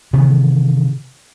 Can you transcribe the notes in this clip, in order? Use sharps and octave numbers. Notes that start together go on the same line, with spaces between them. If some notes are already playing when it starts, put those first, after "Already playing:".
C3 D#3 E3 B3